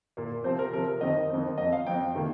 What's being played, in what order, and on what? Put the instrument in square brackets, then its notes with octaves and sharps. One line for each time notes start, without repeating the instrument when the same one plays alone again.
[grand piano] A#2 A#3
C3 F3 C4 C5
A#4
C3 F3 C4 A#4
A#4
F2 D#3 C4 D#5
F2 D#3 C4
F2 F3 C4 D#5
F5
F2 F3 C4 G5
C3 D#3 A#3